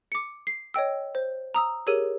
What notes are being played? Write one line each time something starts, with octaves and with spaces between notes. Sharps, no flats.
D6 C#7
C7
C#5 D#5 G5 E6
C5
A#5 D#6 E6
G4 G#4 A#4 C#5 E6 D#7